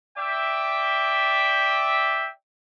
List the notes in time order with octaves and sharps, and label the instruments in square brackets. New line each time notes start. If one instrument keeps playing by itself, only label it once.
[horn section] D5 E5 G5